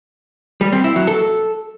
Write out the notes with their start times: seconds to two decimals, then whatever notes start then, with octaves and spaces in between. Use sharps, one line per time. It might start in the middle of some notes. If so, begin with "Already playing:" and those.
0.61 G3
0.72 C4
0.84 E4
0.96 F#3
1.07 A4